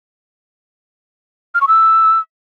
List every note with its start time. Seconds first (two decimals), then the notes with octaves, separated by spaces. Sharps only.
1.55 F6
1.61 C#6
1.68 E6